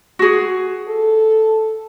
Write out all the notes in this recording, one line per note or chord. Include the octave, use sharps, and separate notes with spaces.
F#4 G#4
A4